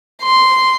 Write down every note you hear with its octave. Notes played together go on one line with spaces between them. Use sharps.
C6